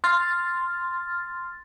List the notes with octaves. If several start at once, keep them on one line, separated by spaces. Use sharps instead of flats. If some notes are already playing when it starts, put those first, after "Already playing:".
C6 F6 A6